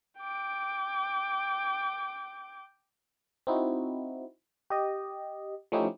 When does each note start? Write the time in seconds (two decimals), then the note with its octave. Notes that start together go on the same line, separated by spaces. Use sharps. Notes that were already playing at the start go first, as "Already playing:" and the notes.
0.20 G5 D6
3.47 C4 D#4 E4 F#4
4.70 G4 D#5
5.72 F3 A3 C#4 D#4 E4 G4